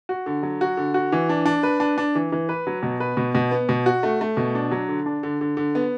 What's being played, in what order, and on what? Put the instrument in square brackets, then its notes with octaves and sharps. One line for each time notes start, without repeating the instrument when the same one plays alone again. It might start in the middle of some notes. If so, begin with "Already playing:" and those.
[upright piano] F#4
D3
F#3
F#4
D3
F#4
E3
D4
D4
B4
D4
D4
E3
E3
B4
F#3
B2
B4
B2
B2
B3
B2
F#4
A3
A3
B2
D4
F#3
D3
D4
D3
D3
D3
B3